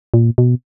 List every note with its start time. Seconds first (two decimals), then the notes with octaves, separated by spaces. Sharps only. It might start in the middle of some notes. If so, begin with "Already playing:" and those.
0.14 A#2
0.38 B2